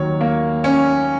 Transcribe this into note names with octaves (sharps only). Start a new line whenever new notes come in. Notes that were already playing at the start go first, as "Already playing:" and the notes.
Already playing: D#2 D#3 F#3 C#5
A#3
C#4